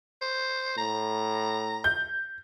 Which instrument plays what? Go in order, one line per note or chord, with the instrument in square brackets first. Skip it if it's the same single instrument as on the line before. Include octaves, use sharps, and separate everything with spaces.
[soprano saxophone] C5
[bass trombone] A2 [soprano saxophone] A#5
[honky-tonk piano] G6